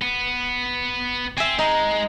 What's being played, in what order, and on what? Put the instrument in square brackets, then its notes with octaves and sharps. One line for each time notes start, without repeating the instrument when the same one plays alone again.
[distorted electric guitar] B3
[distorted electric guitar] C4 [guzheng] E5 G#5
[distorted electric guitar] G#3 [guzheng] D#4